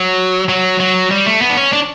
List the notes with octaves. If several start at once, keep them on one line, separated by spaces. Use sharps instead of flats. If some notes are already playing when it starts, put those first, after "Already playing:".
Already playing: F#3
F#3
F#3
G3
A3
B3
D4
C#4
D4